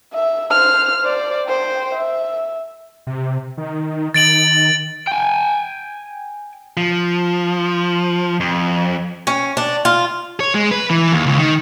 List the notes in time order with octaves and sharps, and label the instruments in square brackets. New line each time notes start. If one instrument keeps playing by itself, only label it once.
[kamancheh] E5
C5 F6
C5 D5
C5 G5
E5
[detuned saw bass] C3
D#3
[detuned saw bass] D#3 [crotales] A6 D7 F#7
[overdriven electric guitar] G5 G#5
[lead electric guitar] F3
F2
[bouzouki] C#4
D4
F4
[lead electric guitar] C#5
G#3
B4
E3
D#2
C#2
D#3